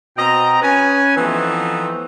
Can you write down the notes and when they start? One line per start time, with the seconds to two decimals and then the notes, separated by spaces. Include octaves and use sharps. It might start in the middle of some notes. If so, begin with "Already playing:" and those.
0.17 B2 C4 D#5 G5 A#5
0.62 C#4 B4 G#5
1.17 E3 F3 A3 B3 C4 D#4